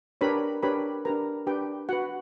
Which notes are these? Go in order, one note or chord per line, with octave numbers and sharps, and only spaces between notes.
D4 G4 A#4 B4 C#5 B5
D4 G4 A#4 B4 C#5 B5
D4 G4 A#4 B4 A#5
D4 G4 B4 G5
F#4 B4 F#5